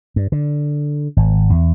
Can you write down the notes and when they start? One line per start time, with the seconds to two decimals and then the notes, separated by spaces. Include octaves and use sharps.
0.16 G2
0.32 D3
1.17 G#1
1.50 E2